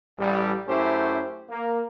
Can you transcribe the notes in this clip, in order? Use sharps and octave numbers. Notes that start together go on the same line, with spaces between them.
A1 G3
F#2 A3 C#4 E4 G4 C5
A#3